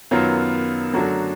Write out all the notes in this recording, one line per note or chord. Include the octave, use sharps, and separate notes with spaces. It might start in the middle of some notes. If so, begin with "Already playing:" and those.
F#2 D#3 F#3 B3 F4
F#2 D3 F#3 A3 D4 F#4